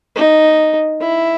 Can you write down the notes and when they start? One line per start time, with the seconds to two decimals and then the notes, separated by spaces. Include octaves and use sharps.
0.16 D#4
1.00 E4